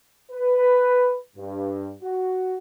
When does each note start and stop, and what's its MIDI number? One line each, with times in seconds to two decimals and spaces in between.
0.32 1.18 71
1.37 1.91 43
2.03 2.57 66